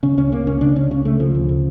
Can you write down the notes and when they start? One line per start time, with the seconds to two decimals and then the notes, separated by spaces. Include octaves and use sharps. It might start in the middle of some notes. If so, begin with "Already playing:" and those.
0.03 C#3 C#4
0.17 C#2 C#4
0.32 C#3 A#3
0.47 C#2 C#4
0.61 C#3 D4
0.76 C#2 C#4
0.91 C#3 C#4
1.05 C#2 A3
1.19 C#3 F3
1.35 D2
1.49 C#3